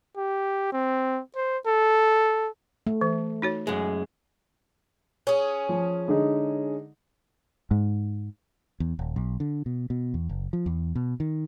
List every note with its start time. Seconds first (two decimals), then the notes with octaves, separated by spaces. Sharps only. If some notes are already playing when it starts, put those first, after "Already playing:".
0.17 G4
0.72 C4
1.36 C5
1.67 A4
2.87 A3
3.01 E3
3.42 D#4 F#4 C#5
3.67 F#2 G#3
5.27 C#4 G#4
5.69 F3
6.08 D3 G#3 D#4
7.71 G#2
8.80 E2
8.99 D#1
9.16 B1
9.40 D3
9.66 B2
9.90 B2
10.14 E2
10.29 F#1
10.53 F3
10.66 E2
10.95 B2
11.20 D#3